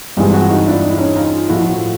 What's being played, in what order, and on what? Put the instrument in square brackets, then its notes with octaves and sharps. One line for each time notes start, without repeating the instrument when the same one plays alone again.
[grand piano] G2 E3 G#3 C4 [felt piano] F4 G4
[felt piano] E4 F#4
D#4 F4
D4 E4
D#4
E4
C#4 D#4
D#4 F4
[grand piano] A2 F3 A3 [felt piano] E4 F#4